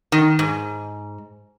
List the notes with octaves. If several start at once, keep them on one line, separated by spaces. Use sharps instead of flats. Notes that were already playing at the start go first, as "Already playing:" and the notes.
D#3
G#2